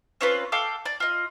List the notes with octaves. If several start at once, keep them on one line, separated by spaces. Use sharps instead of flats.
C4 C#4 F4 B4
A4 F5 G5 D6
D5
F4 D#5